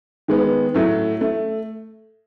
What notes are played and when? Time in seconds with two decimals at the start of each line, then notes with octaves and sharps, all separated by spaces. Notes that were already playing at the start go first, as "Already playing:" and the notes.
0.28 D#3 G#3 B3
0.74 A2 F#3 A3
1.21 A3